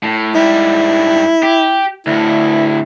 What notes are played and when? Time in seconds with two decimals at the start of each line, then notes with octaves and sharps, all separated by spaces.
0.03 A2
0.34 G#2 G3 E4
1.43 G4
2.07 D2 A2 E4